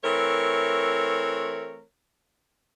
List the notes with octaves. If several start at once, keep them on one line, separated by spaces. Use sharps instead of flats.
E3 A3 C4 A#4 C#5